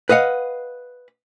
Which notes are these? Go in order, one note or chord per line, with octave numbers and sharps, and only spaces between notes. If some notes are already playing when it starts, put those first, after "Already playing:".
B4 D#5 F5 F#5